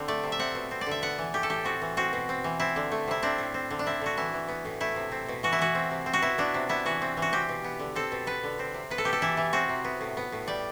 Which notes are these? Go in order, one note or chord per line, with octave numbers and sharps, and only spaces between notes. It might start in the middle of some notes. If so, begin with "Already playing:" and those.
Already playing: D3 C4
A3 D5
C3
E5
C4 F#5
B2
C4
D5
D3
E5
B3 F#5
E3
A3 G4
A4
A2 G4
C4 F#4
E3
C4 F#4
B2
C4
E3
C4 E4
D3
A3
C3 E4
C4 D4
A2
C4
D3
D4
C4 E4
D3 F#4
E3 E4
E3
B3
A2
A3 E4
C3
C4
B2
E3 F#4
E4
E3 F#4
C4
C3
C4
F#4
B2 E4
B3 D4
C3
B3 E4
E3 F#4
C4
E3
F#4
C4 G4
B2
B3
D3
C4 A4
B2
B3 B4
D3
C4
C3
B3 B4
A4
B2 G4
A4
E3 E4
E3
C4 F#4
C3
B3
A2
B3
A2
G3 D5